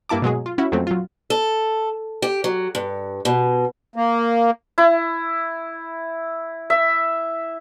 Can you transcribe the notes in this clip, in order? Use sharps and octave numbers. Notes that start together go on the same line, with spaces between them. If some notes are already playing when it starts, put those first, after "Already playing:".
G2 A#3 E4 A5 D6
B2 F#3 G#3 G#4
F4
C#4 E4 F#4
F2 A#2 F#3 A3 C4 C#4
F#3 F4
A4
G4
F#3
G2
B2
A#3
E4
E5